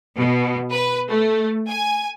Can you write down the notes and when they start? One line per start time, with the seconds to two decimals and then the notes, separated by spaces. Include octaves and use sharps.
0.16 B2
0.72 B4
1.08 A3
1.68 G#5